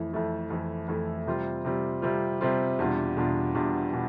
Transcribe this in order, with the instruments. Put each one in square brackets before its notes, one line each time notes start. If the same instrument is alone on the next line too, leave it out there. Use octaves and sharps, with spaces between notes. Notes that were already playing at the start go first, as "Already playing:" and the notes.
Already playing: [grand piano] F2 E3 A3 E4
F2 E3 A3 E4
F2 E3 A3 E4
F2 E3 A3 E4
C3 G3 C4 F4
C3 G3 C4 F4
C3 G3 C4 F4
C3 G3 C4 F4
E2 B2 G3 D4 F4
E2 B2 G3 D4 F4
E2 B2 G3 D4 F4
B2 G3 D4